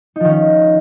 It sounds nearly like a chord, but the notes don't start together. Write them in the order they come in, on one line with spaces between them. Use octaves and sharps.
D#4 F3 D#3 C#4